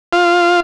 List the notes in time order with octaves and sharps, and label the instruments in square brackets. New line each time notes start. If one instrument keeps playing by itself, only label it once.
[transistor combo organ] F4